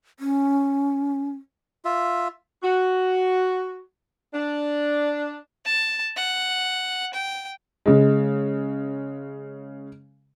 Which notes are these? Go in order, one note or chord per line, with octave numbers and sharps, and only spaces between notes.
C#4
F4 E5
F#4
D4
A5
F#5
G5
C#3 G#3